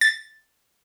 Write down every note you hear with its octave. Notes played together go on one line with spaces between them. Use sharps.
A6